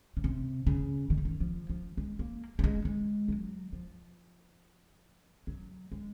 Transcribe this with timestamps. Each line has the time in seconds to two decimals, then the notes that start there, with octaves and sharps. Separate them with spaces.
0.17 C#3
0.24 C3
0.67 C#3
1.10 D#3
1.18 C#3
1.25 D#3
1.40 F3
1.70 F3
1.97 G#3
2.19 A#3
2.59 A#3
2.64 G#3
2.85 G#3
3.28 F#3
3.73 F3
5.47 F#3
5.92 G#3